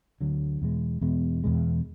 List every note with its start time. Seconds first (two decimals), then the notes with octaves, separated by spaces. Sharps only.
0.21 D2 D3 F#3
0.62 E2 B2 G#3
1.01 E2 B2 G#3
1.44 E2 B2 G#3